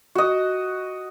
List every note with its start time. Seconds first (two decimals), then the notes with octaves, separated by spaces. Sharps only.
0.15 F#4 D#5